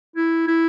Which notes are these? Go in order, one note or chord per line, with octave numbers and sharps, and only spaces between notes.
E4
E4